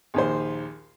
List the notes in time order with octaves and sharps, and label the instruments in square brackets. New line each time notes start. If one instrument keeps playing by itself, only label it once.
[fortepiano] A#1 D#2 C5